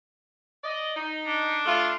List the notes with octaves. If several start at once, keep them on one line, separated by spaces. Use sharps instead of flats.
D5 D#5
D#4
D4
A3 F4